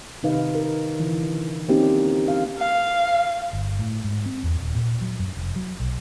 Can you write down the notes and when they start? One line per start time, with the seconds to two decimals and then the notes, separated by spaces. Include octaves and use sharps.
0.23 C3 D#3 D#4 B4 F5
0.55 A#4
0.99 D3 E3
1.69 A#3 C4 C#4 D#4 G4
2.28 F5
2.59 F5
3.53 G1
3.79 A2
4.04 G#2
4.26 C4
4.43 E2
4.60 D#1
4.75 A#2
5.01 F#3
5.19 F#2
5.37 F1
5.56 F#3
5.80 B1